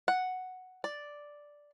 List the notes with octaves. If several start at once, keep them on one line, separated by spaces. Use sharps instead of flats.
F#5
D5